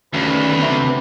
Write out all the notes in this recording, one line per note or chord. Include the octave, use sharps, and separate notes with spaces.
D2 D#3 C#4 B4
C4 E5